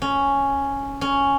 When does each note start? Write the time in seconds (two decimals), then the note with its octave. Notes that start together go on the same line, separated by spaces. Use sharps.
0.02 C#4
1.01 C#4